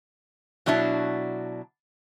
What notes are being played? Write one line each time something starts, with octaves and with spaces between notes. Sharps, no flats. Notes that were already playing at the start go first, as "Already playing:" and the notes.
B2 F#3 D4 E4 A5